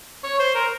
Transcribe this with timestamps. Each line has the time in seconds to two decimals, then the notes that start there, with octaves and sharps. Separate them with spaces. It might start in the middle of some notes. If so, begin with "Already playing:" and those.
0.23 C#5
0.39 C5
0.55 A#4